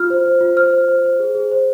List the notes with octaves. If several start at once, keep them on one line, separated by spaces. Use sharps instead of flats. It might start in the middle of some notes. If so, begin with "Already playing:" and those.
Already playing: F4 F6
C5
C5
F4
C5 F6
C5
C5
C5
G#4
G#4
C5